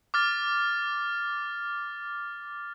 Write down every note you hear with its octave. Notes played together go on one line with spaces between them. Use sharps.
D6 F6 A6